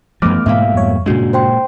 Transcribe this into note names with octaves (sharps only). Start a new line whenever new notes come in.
F#2 E3 F3 A3 B3 D6 F6
G#2 B2 A#3 E5 F5
F2 G3 C#5
G2 A#2 C#3 G#3 D4 F#4
C5 G5 C6